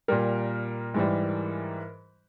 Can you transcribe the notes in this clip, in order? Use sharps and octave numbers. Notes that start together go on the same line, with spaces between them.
A#2 G3 A#4
G#2 E3 G3